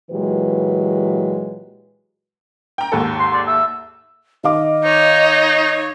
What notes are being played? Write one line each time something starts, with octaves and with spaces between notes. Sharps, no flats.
A#2 E3 F#3 G#3 G4 B4
G5 A#5
D#2 G#2 A4
C6
D5
E5
D#3 D#5 F5 D6
D#4 C#5